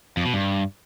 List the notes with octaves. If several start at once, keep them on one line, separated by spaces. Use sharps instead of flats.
F2
B2
G2